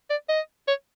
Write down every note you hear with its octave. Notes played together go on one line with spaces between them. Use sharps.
D5
D#5
C#5